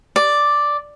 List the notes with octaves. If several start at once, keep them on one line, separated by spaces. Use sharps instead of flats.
D5